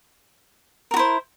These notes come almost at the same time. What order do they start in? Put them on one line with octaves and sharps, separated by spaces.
A#4 F#4 E4 C5